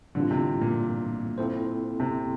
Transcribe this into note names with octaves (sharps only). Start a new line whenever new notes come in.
A2 D3 E3 G3 C4 F4
C3
A#2
C4 E4 A4 C5
C3